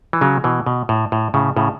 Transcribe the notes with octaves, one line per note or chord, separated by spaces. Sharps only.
E3
C#3 F#3
B2 E3
B2
A2
A2
A2 C#3
A2 C#3